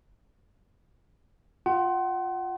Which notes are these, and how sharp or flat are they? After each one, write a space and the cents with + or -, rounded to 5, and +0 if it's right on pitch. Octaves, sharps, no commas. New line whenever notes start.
F4 +10 F#5 +35